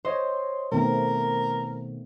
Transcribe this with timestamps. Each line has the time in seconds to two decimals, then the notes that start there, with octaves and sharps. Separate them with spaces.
0.05 C5 C#5 D#5 C6
0.72 B2 D#3 A3 B3 C4 A#4